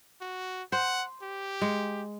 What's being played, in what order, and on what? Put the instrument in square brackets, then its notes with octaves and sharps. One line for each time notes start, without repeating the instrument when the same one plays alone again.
[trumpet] F#4
[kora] C5 [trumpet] F#5
[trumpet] G4
[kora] G#3